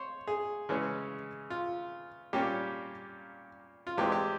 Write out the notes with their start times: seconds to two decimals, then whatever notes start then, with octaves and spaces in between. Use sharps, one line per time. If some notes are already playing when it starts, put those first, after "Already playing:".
Already playing: C5 C#5
0.27 G#4
0.69 C#3 E3 G#3 C#4
1.50 F4
2.33 A#2 G3 A#3 C#4 G4
3.87 F4
3.98 E2 E3 G#3 C4 G4
4.12 G4